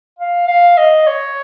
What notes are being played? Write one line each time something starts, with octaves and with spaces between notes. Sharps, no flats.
F5
F5
D#5
C#5